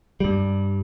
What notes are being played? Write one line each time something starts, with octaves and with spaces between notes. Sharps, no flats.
G2 G3